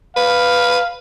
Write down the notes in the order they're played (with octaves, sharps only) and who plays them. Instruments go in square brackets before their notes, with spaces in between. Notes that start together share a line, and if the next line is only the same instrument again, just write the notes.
[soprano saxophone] B4 [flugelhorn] F5